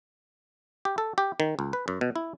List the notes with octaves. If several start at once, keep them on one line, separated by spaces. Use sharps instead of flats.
G4
A4
G4
D#3
C#2
B4
F#2
B2
E4